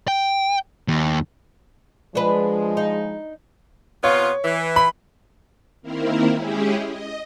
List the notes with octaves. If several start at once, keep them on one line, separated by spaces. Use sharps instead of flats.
G5
D#2
F3 G#3 D4 B4
D#4
C3 B3 F4 C#5
E3
B5
D#3 A#3 C4 E4 A#4
G#3 C#4 E4 G4 G#4
D#5